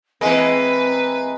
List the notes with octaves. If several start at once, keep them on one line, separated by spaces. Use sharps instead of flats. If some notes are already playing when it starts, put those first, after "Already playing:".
E3 G#3 A#3 C4 B4